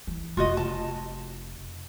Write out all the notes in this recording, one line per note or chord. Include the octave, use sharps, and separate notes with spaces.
E3
F1 F4 F#4 D#5
A5